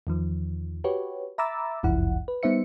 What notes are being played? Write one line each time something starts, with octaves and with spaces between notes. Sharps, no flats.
E2 D#3 F3
F#4 G4 B4 C#5
E5 A#5 B5 D6 E6 A6
G1 C#2 F#2 F3 E4 F#5
B4
G3 B3 D#4 C5 E5 C#7